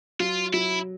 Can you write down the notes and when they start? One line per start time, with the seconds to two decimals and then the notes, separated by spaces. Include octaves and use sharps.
0.20 F#3 F4
0.53 F#3 E4